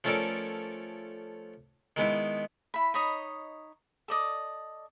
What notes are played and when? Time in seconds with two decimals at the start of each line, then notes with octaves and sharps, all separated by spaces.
0.04 F3 A3 C#4 A4 A#4 D5
1.96 D#3 G#3 B3 E4
2.74 E4 B5
2.94 D#4 C#5 D#5 B5
4.08 A4 D5 D#5 D6